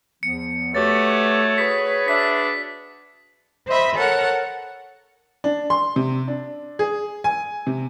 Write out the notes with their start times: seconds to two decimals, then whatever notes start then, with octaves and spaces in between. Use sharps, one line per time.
0.23 E2 F3 B3 C#7
0.75 A3 F#4 G4 B4 C#5 A6
1.58 F#4 G#4 B4 B6
2.08 D4 E5 B6
3.67 C5 D#5 E5 B5
3.97 A4 A#4 C#5 F#5
5.44 D4
5.70 C6
5.96 C3
6.28 D4
6.79 G#4
7.24 G#5
7.67 C3